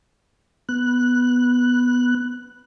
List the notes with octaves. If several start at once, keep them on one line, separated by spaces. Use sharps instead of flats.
B3 F#6